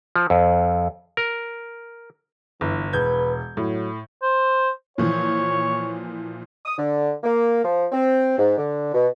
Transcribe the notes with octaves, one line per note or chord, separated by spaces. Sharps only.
F3
F2
A#4
G1 E3
E1 B4 G6 G#6
A2 F#3
C5
A#2 E3 F3 C#5
D#6
D3
A#3
F3
C4
G#2
D3
B2